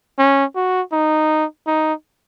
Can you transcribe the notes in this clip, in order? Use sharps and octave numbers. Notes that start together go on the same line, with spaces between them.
C#4
F#4
D#4
D#4